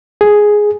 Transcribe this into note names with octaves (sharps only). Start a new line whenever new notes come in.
G#4